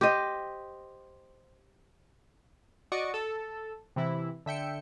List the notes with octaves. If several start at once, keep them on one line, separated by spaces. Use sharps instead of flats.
G4 C5 D#5
F#4 D5 D#5 C#6 D6
A4
C3 E3 E4
D3 E5 G5 C#7